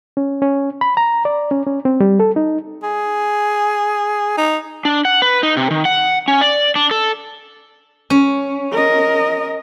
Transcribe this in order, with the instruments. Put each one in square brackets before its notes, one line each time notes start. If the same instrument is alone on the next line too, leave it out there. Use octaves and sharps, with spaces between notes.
[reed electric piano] C#4
C#4
B5
A#5
D5
C#4
C#4
C4
G3
A4
D#4
[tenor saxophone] G#4
D#4
[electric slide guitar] D4
F#5
B4
D#4
C3
D#3
F#5
C#4
D5
D4
A4
[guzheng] C#4
[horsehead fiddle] A#4 D#5